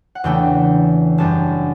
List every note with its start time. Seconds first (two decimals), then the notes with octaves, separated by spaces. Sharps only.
0.15 F#5
0.24 E2 C#3 E3 A3 D4 G5
1.18 F#1 F#2 C#3 G3 D4 A5